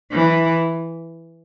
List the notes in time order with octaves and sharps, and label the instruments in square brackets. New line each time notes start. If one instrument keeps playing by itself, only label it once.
[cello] E3